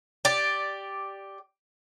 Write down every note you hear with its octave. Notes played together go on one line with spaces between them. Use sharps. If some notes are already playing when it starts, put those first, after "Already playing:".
G4 D5